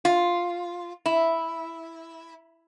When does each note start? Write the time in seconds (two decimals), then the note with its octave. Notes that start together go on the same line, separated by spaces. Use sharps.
0.05 F4
1.06 E4